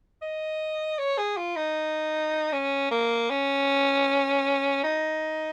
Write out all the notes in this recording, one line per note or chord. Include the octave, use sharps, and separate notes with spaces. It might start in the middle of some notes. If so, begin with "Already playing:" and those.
D#5
C#5
G#4
F4
D#4
C#4
A#3
C#4
D#4